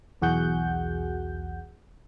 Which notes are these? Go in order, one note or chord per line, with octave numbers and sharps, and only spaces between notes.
B1 E2 F#4 G#4 F#5 G6